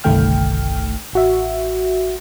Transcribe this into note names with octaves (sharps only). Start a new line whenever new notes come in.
G1 C2 D#3 A3 G5 F6
A1 F#4 E5